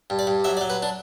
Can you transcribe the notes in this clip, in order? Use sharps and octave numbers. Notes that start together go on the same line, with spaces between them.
G2
D5
G2
F#3 E5
D5
F#3
B4
D4